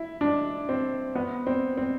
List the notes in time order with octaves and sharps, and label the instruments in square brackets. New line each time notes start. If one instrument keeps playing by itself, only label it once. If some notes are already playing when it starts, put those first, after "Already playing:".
Already playing: [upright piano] E4
D4
C4
B3
C4
C4